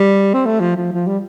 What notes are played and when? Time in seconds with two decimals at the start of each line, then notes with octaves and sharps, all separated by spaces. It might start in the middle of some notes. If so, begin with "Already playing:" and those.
Already playing: G3
0.34 C4
0.45 A3
0.60 F3
0.77 F3
0.92 F3
1.07 G3